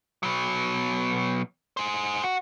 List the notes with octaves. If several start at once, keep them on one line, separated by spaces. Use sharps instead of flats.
B2 F#3
G#4 C5
F#4